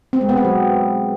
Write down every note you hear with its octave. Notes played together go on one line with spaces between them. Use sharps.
C4
G#3
B3
C4
F#3